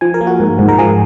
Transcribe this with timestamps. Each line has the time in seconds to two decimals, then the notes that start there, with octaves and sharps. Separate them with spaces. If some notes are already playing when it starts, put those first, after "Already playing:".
0.01 F3 G#5
0.14 A#4
0.21 A#3
0.27 F#4
0.40 G#2
0.59 G#2
0.68 A#4
0.79 F3 G#4